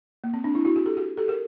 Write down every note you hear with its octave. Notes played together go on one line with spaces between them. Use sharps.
A#3
C4
C4 D4
D4 E4
E4 F#4
F#4 G#4
G4 A4
F#4 G#4
G4 A4
G#4 A#4